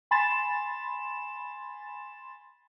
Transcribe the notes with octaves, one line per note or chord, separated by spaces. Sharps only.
G#5 B5 C6 A6 E7